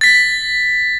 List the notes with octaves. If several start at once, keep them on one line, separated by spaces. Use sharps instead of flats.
A6 B6